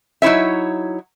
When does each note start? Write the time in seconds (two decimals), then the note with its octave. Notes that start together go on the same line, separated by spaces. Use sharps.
0.22 F#3 D#4 E4 C#5 E5